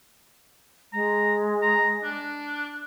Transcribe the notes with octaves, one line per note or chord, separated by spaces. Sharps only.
G#3 A#5
A#5
D4